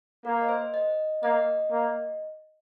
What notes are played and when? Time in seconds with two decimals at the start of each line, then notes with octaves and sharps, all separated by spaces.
0.25 A#3 A#4
0.41 D#5
0.49 C5
0.74 D#5
1.23 A#3 D#5
1.71 A#3